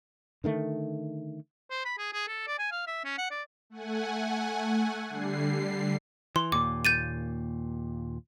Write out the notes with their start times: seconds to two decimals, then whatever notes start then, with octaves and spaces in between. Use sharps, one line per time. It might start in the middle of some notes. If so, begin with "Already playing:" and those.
0.44 D3 D#3 A3
1.70 C5
1.85 B5
1.98 G#4
2.13 G#4
2.27 A4
2.47 D5
2.59 G#5
2.72 F5
2.87 E5
3.05 C#4
3.18 F#5
3.31 D5
3.70 A3 F#5 G#5
5.09 D3 G3 C7
6.36 E3 C6
6.52 D#2 A#2 D6
6.85 G6 A6 D#7